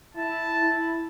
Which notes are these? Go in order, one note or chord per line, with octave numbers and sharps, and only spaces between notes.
E4 A5
E4